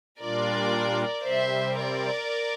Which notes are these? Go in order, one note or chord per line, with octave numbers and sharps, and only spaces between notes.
A#2 G3 D4 F4 A#4 D5
C3 G3 C4 C5 E5
A#4 D5